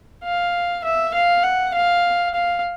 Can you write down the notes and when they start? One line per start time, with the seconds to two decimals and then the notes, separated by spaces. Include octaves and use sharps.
0.24 F5
0.84 E5
1.14 F5
1.44 F#5
1.74 F5
2.35 F5